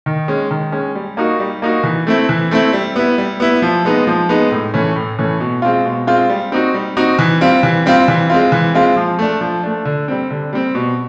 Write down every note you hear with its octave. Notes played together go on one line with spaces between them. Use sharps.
D#3
G#3 C#4
D#3
G#3 C#4
G3
A#3 D#4 F#4
G3
A#3 D#4 F#4
E3
A3 C4 E4
E3
A3 C4 E4
G3
B3 E4
G3
B3 E4
F3
G#3 B3 D#4
F3
G#3 B3 D#4
A2
E3 A3 C#4
A2
E3 A3 C#4
B2
G#3 C4 F4
B2
G#3 C4 F4
G3
C4 D#4 F#4
G3
C4 D#4 F#4
E3
G3 C4 F4
E3
G3 C4 F4
E3
G#3 C4 F4
E3
G#3 C4 F4
F3
A3 D4
F3
A3 D4
D3
G3 C4
D3
G3 C4
B2